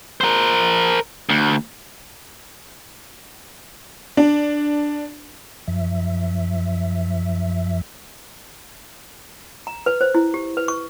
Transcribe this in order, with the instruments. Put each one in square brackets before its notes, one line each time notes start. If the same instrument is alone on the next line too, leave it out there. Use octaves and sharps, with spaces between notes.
[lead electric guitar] A#4 C5
D2
[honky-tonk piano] D4
[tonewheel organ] F#2 F3 E5
[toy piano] A#5
B4
C5
E4
G4
B4
C#6